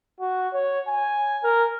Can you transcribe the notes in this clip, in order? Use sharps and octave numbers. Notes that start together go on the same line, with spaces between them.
F#4
C#5
G#5
A#4